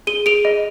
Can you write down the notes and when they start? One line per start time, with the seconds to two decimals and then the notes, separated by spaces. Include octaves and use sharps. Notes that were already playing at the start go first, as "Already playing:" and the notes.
0.07 G#4 D#7 G7
0.26 G#4 D7 F7
0.45 D#5